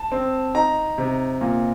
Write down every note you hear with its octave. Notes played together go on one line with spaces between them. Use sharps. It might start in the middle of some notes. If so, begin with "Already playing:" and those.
Already playing: A5
C4
D#4 A#5
C3
A#2